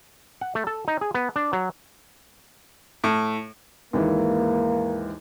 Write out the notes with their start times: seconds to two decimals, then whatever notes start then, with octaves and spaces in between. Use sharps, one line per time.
0.41 F#5
0.55 A3
0.67 A4
0.88 D#4
1.01 G#4
1.14 B3
1.36 D4
1.53 F#3
3.04 A2
3.93 D#2 G#2 E3 A#3